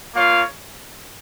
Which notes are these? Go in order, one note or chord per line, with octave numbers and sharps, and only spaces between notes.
A#3 F4 C#5 F5